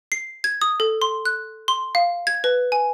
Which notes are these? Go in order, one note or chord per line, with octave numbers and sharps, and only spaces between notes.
C7
G#6
D#6
A4
C6
F#6
C6
F5
G#6
B4
G#5